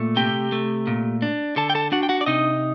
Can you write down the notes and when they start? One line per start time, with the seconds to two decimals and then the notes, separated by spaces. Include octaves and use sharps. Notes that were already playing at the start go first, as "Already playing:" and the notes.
Already playing: A#2 A3
0.16 C3 G4 G5
0.52 A3
0.87 A#2
1.22 D4
1.56 D3 A4 A5
1.70 G5
1.75 A4 A5
1.92 D4 F#4 F#5
2.03 G5
2.09 F#4 F#5
2.21 D5
2.26 C3 D#4 D#5